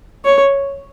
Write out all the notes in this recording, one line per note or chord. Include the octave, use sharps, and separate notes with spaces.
C#5